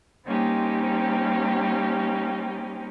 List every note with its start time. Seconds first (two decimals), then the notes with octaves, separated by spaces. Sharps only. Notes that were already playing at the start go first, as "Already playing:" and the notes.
0.26 G3 A#3 C4 C#4 D#4 G4